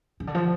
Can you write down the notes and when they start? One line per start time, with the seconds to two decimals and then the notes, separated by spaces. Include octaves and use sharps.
0.20 C#3
0.27 D3
0.35 F3